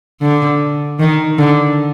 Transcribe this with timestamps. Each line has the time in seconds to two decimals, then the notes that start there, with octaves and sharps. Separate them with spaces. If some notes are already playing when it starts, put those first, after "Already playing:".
0.21 D3
0.99 D#3
1.38 D3